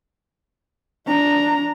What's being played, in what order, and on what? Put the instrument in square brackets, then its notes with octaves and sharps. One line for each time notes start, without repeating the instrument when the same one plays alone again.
[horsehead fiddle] D4 A#5